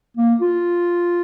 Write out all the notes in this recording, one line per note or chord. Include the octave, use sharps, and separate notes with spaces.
A#3
F4